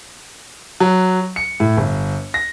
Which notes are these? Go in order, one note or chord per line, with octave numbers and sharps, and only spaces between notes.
F#3
C#7
A2
G1
A#6